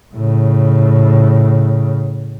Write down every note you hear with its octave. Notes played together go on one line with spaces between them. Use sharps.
A2 C#3